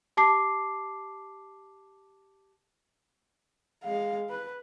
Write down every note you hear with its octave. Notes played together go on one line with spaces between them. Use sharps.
G4 A5 D6 C7
G#3 F5
B4